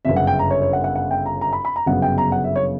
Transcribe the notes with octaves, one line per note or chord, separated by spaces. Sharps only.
G1 F#2 C#3 E5
F#5
G5
A#5
C#5
C#5
F#5
F#5
F#5
G5
A#5
A#5
B5
B5
A#5
G1 F#2 C#3 F#3 B3 F#5
G5
A#5
F#5
E5
C#5